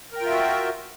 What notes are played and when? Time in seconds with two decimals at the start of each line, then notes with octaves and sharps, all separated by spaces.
0.12 A#4
0.17 G5
0.21 F4
0.26 E5
0.31 F#4